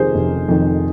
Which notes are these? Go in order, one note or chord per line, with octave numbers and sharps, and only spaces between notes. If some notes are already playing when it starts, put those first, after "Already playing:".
Already playing: F1 F2 D#3 G4 G#4 A#4 C5
F1
F2 D#3